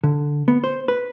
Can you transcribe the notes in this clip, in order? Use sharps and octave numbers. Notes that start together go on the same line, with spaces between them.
D3
B3
C5
B4